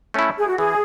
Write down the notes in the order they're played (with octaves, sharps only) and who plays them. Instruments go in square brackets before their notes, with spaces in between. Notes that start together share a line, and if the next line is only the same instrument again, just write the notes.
[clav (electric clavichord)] A3 C#4 E4
[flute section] G#4
F#4
[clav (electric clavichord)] E3 [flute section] G#4